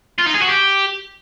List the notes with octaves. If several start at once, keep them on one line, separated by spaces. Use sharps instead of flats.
F4
D#4
G#4
F#4
G4